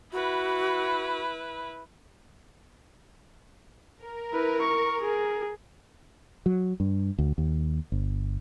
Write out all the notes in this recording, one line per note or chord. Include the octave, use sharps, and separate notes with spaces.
E4 F#4 B4
A#4
E4 B4
C#6
G#4
F#3
G2
D2
D#2
G1